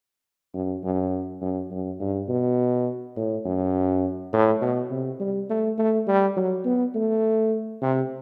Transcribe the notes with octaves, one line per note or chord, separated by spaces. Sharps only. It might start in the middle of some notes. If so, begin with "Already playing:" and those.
F#2
F#2
F#2
F#2
G2
B2
A2
F#2
A2
B2
C3
G3
A3
A3
G3
F#3
B3
A3
C3